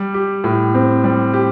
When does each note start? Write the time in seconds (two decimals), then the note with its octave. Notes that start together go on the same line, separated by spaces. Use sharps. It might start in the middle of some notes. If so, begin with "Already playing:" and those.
Already playing: G3
0.14 G4
0.44 A2
0.74 C4
1.04 G3
1.34 G4